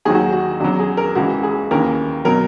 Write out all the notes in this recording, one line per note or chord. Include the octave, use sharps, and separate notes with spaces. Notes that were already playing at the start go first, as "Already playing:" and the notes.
D#2 D#3 F#3 G#4
F#4
F#4
E2 C#3 F#3 F#4
G#4
A#4
C#2 C#3 E3 F#4
G#4
D#2 C#3 E3 A#4
B2 F#3 A#4